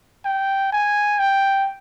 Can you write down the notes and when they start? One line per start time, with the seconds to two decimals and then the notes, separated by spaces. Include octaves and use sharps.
0.25 G5
0.72 G#5
1.19 G5